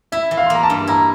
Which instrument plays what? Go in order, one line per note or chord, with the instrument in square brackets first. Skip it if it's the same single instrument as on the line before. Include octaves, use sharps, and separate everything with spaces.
[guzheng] E4 [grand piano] E5
[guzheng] E3
[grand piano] F5
C6
[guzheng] A#3 [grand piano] A#5
[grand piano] A5
[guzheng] G2
[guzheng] E4 [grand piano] A#5